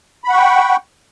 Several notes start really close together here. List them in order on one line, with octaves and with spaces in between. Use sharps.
B5 F#5 C#6 G5